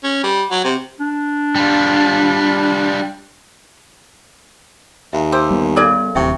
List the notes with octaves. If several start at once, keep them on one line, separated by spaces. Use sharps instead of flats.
C#4
G3
F#3
C3
D4
G3 F4
D#2 E5
G4 A#4 C5
G3 B3
C#3 A4 D5 F5 G#5
D1 D#2 C3 E5 G5 C#6